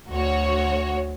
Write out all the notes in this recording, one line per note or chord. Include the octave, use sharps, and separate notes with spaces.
D2 F#4 C#5